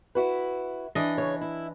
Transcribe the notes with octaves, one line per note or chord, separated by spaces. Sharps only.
E4 F#4 B4
E3 D4 D#5
C#3 C#5
E4